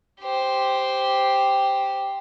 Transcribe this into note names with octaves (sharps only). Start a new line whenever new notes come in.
G4 C5